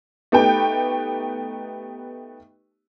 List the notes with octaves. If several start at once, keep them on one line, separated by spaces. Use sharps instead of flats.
A3 B3 D#4 G4 B4 G5